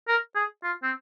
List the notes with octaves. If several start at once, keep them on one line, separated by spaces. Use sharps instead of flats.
A#4
G#4
F4
C4